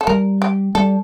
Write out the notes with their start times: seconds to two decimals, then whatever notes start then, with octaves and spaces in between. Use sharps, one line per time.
0.01 A4
0.07 G3 A#4
0.42 G4
0.75 G3 A4